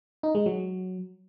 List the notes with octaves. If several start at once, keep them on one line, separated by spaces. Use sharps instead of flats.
D#4
G#3
F#3